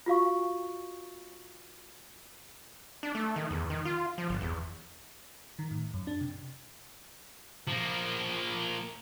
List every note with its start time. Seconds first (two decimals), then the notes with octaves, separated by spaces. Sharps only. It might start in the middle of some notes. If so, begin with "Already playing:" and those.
0.06 F4 F#4 F5 C#6
3.03 D4
3.15 A3
3.36 D#3
3.51 E2
3.70 D#3
3.85 F4
4.18 F3
4.30 G1
4.41 E2
5.59 D#3
5.71 A2
5.94 F#2
6.07 D4
6.21 C3
7.68 F3 A#3